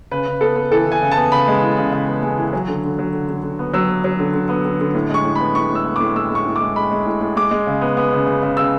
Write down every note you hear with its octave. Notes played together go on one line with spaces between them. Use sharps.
C#3 B4
C#3
B3 A4
B3
E3 A4
E3 G#5
C#3
A5
B3
C#3 B5
G#3
E3
C#3
C#3
B3
G#3
E3
F#3
D3
D3
F#3
D3
D3
D3
B3
F#3 E6
B3
F#3
D3
D3
B3
D3
D3
A2
G#3 C#6
A2
B3 B5
A2 C#6
A2
E6
B3
A2 D6
G#3 E6
G#3
C#6
A2
D6
G#3
G#3 B5
G#3
A2
A2
G#3 D6
G#3
C#3
B3
B3
C#3
C#3
C#3
C#3 E6